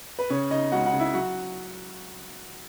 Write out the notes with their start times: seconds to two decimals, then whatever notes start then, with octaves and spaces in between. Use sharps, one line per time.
0.19 B4
0.30 C#3 C#4 C#5
0.51 C#3 D#4 D#5
0.72 C#2 F#4 F#5
0.86 F#4 F#5
0.93 C#3
1.00 E4 E5
1.14 F#3 F#4 F#5